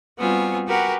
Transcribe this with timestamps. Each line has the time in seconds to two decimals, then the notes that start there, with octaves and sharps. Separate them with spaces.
0.17 G3 B3 C4 F4 F#4 G#5
0.67 F#4 G4 A#4 B4 F#5 G#5